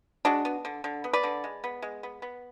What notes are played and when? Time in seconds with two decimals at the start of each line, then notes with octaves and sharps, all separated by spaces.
0.25 G#3 D4 F#4
0.45 B3
0.65 D3
0.84 D3
1.04 B3
1.13 B4 D5
1.23 D3
1.44 G#3
1.64 B3
1.82 G#3
2.03 B3
2.22 B3